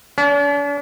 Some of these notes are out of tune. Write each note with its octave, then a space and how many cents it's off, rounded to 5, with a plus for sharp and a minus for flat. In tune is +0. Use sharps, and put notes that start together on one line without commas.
D4 -45